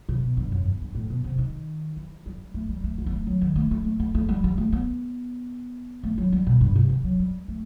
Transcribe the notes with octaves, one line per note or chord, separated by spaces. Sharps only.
C3
B2
G2
F#2
E2
G2
A2
B2
C3
D#3
E3
G3
A3
G3
A3
A3
B3
A3
F#3
D#3
A3
A3
A3
A3
A3
G3
G3
A3
B3
A3
F#3
G3
B2
G2
C3
E3
F#3
G3
A3